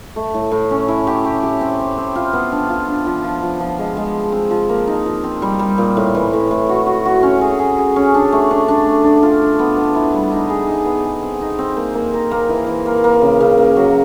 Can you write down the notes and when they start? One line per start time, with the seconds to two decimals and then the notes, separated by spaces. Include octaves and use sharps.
0.16 A3
0.34 A2
0.52 A2
0.71 C#4
0.88 E4
1.07 G4
1.24 G4
1.43 G4
1.61 C4
1.79 C4
1.98 C4
2.15 F4
2.33 B3
2.52 D4
2.69 F4
2.88 D4
3.06 F3
3.24 F3
3.43 F3
3.60 F3
3.79 G#3
3.97 G#3
4.15 C4
4.32 C4
4.51 F3
4.69 A#3
4.87 D#4
5.06 F3
5.24 C4
5.42 G3
5.59 G3
5.78 A#2
5.97 A2
6.15 E3
6.33 A2
6.51 A2
6.69 F#4
6.87 F#4
7.05 F#4
7.23 C#4
7.41 G#4
7.59 G#4
7.78 G#4
7.96 C#4
8.14 D4
8.32 A3
8.51 D4
8.68 D4
8.86 A3
9.04 D4
9.23 F4
9.41 D4
9.59 B3
9.77 B3
9.95 E4
10.13 G3
10.32 D#4
10.50 G#4
10.67 D#4
10.86 B3
11.05 G#4
11.23 C4
11.41 D#4
11.59 C4
11.77 A#3
11.95 A#3
12.14 A#4
12.31 A#3
12.49 E3
12.67 E3
12.86 A#3
13.04 A#3
13.21 C#3
13.41 C#3
13.58 A#3
13.76 F#3